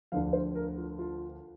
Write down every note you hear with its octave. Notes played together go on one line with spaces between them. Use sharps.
D2 D3 F3 F5
C5
A#4
F4
F4